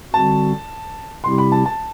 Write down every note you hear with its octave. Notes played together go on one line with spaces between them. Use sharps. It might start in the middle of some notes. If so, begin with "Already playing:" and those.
D3 G3 C4 F#4 A5
C3 G3 C4 E4 G4 C6
B5
A5
A5